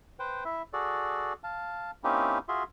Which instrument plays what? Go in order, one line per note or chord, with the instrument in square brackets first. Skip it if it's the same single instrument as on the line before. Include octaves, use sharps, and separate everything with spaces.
[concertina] B4 C5 G5
E4 E5
F#4 G#4 A4 D5
F5 A5
A#3 C4 C#4 D#4 E4 G4
F4 F#4 G#4 E5 C6